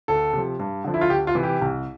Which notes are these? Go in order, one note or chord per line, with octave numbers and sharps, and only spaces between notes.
D2 A4
C3 F3
G2
D3 F3
E4
F4
D2 G4
F4
C3 E3
G4
C2